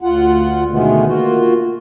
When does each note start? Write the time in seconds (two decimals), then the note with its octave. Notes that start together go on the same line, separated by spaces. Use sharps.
0.01 D2 F4 F#5
0.71 B2 D3 D#3 G#3 A3 B3
1.06 A#3 F4 F#4